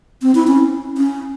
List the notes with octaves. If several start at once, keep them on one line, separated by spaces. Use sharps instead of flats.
C4
E4
C#4
C#4